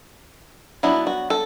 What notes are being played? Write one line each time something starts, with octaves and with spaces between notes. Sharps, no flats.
F#3 B3 D4 E4
F#4
A4